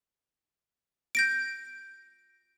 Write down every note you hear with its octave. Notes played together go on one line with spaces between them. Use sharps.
G6 A#6 D7